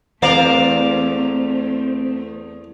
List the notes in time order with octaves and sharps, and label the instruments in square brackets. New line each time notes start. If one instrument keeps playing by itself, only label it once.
[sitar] E2 A#4 D5 [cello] A3 [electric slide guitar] C4 [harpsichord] C5 F5